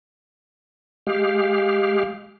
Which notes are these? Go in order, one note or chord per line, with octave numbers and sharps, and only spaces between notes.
G#3 G4 F5